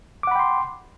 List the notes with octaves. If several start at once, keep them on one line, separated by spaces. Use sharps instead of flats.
F#5 G5 B5 C6 D6